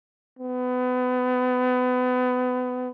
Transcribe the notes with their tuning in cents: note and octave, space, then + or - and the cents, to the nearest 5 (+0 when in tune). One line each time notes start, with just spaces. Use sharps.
B3 +30